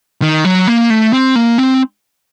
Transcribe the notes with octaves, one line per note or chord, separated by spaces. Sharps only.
D#3
F#3
A#3
A3
C4
A#3
C4